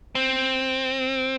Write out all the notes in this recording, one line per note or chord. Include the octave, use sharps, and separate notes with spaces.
C4